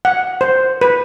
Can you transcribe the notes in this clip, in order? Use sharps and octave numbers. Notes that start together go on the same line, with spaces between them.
F#5
C5
B4